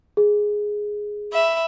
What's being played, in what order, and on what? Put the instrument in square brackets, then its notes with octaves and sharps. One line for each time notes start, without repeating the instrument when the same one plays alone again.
[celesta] G#4
[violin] E5 B5